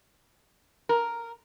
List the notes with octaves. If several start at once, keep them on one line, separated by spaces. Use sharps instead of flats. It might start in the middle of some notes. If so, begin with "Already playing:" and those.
A#4